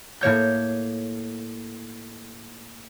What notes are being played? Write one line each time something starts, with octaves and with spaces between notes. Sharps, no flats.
A2 A#3 C#5 G6